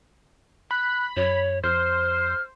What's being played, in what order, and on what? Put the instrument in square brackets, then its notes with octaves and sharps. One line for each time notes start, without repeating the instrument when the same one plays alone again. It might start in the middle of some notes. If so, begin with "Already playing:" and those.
[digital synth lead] B5 [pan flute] F#6
[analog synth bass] F#2 [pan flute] C#5
[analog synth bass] F2 [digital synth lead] C5 [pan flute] F6